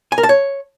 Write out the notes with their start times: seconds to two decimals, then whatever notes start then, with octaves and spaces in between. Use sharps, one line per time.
0.12 G#5
0.18 A#4
0.23 A5
0.29 C#5